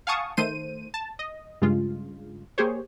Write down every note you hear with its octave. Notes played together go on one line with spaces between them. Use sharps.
F5 F#5 G#5 A5 C#6 D#6
D#3 A3 C5 D#7
A5
D#5
G2 C#3 G#3 F4
A#3 G4 G#4 C5 C#5